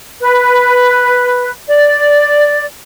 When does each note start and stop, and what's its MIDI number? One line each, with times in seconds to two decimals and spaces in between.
0.20 1.51 71
1.68 2.63 74